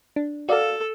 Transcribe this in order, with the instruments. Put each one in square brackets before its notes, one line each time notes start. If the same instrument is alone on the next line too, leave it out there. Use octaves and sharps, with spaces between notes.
[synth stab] D4
[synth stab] F#4 D5 F5 [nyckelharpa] A4